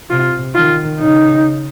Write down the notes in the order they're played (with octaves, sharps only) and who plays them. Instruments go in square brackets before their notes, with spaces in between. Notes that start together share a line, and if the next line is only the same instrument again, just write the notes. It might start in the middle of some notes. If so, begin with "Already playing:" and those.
[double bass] C3 [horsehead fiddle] F4
[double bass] D#3 [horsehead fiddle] F4
[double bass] C#3 [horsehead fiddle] D#4